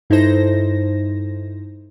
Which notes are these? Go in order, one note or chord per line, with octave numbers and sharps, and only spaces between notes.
G2 D#4 E4 A4 C5 A#6